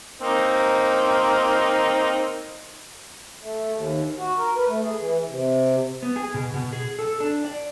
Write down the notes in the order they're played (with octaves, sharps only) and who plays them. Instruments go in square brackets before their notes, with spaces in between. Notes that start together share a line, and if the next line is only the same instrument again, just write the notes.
[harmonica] A#3 C4 D#4
[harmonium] A3
D#2
F#4
A#4
B4
A3
G#4
E3
C3
[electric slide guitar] B3
G#4
B2
B2
G#4
A4
D4
D5